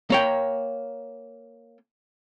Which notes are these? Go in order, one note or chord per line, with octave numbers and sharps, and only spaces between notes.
A#3 C#5 G5